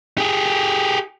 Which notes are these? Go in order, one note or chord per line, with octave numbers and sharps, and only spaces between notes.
G4 G#4